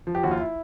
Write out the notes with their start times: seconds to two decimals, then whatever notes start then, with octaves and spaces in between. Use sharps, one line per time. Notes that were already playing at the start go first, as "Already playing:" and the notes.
0.07 F3
0.15 G4
0.23 D#2 F#4
0.31 F4
0.40 E4